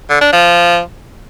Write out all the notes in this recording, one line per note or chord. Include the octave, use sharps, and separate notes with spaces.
D3
D4
F3